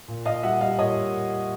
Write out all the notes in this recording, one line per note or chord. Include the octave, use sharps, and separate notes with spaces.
A#2
A#2 D#5 F5
G3 E5 F#5
G3 D#5 F5
A#2 C#5 D#5
A#2